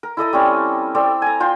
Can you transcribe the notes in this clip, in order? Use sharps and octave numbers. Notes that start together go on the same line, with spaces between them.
A#4
E4 A4 D#5 A#5
G3 C4 C#4
C4 A4 D5
G#5 A#5
F4 G5 C6